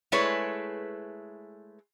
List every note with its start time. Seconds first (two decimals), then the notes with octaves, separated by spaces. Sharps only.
0.12 G#3 A3 E4 G#4 B4 C#5